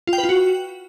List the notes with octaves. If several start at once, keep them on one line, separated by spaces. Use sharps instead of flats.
F4
G5
B4
F4
F#4